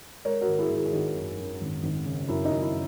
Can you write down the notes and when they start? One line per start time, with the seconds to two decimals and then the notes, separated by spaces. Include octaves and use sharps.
0.24 G#3 A#4 C#5
0.41 F#4 A#4
0.47 G#1
0.59 E4 G#4
0.70 G#1
0.75 E4 G#4
0.86 G#4
0.93 G#1 D#4 F#4
1.15 F#2
1.38 F#2
1.61 G#1
1.83 G#1
2.06 C#3
2.28 F#2 E4
2.45 D#4
2.51 F#2
2.62 E4